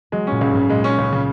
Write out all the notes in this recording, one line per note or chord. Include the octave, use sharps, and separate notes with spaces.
F#3 G#3
A#2 C#4
C#2
G#2 C#3
A#2 G#3
C#4
C#2
C#3